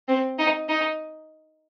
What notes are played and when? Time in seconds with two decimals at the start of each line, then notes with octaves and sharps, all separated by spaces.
0.08 C4
0.38 D#4
0.68 D#4